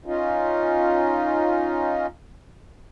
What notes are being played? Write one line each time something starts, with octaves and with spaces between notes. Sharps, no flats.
C#4 D#4 F4